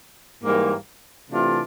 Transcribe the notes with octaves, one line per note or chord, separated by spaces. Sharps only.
G#2 E3 G3 A#3
C3 E3 A3 D4 F4